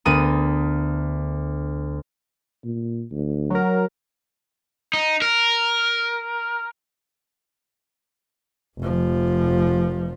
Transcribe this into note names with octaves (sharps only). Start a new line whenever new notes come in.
D2 B3 A#4 D#6 D#7
A#2
D2
F#3 A#4
D#4
A#4
F1 F3